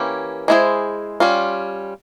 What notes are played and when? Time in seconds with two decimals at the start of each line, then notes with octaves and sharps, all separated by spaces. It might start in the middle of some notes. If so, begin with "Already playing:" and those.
Already playing: E3 A#3 C#4 E4 G4
0.48 G#3 E4 G#4 C5
1.20 G3 C#4 F4